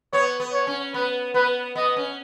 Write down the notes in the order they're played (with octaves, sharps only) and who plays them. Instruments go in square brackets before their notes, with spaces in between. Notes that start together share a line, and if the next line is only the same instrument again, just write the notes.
[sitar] B3 [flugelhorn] C#5
[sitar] B3
[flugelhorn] C#5
[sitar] C#4
[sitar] B3 [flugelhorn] B4
[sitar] B3 [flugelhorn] B4
[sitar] B3 [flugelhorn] D#5
[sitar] C#4